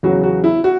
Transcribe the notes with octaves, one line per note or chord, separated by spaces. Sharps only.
E2 C#3 F#3 F#4
F#4
E4
F#4